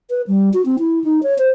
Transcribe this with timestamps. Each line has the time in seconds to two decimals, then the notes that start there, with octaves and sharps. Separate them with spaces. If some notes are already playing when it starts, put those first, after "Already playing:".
0.10 B4
0.27 G3
0.54 F#4
0.66 C4
0.79 E4
1.04 D#4
1.23 C#5
1.38 C5